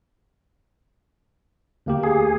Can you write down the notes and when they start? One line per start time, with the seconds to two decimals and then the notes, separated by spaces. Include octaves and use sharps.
1.86 D2 A#3 G4
2.03 G#4